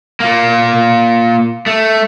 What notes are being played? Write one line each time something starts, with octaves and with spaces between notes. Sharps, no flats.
A#2 A#3
A3